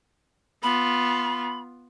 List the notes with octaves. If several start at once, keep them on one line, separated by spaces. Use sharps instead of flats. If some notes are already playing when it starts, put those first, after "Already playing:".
B3 F4 B5